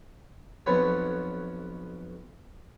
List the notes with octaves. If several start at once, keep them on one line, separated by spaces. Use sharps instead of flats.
B1 F2 B3 C#5